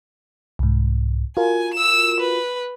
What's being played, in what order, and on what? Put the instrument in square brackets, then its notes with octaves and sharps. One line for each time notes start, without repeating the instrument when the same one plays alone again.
[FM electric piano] C2 G#2
[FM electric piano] F4 F#4 A#4 [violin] G#5
[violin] E6 E7
B4